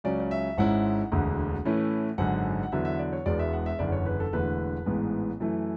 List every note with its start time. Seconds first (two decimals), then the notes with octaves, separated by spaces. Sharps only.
0.04 C#2 C#3 F#3 C#4 D5
0.20 D5
0.31 E5
0.57 G#1 G#2 G#3 C#4 E4 F#5
1.12 E1 D2 D3
1.65 A2 E3 A3 C#4 E4
2.18 G#1 F#2 D3 F#5
2.63 F#5
2.72 E2 D3 F#3 B3 E5
2.85 E5
2.99 D5
3.13 C#5
3.26 E1 E2 B2 G#3 B3 D5
3.39 E5
3.53 F#5
3.66 E5
3.79 F#1 E2 D3 D5
3.92 C#5
4.06 B4
4.20 A4
4.33 E1 E2 D3 A3 B4
4.86 A1 G#2 E3 G#3 B3
5.40 F#2 E3 A3 E4